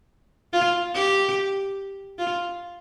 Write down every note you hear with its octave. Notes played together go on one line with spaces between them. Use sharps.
F4
G4
F4